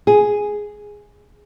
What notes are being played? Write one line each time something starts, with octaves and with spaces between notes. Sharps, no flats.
G#4